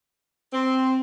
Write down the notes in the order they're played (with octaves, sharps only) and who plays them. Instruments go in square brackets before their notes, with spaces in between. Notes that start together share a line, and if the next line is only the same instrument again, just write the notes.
[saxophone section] C4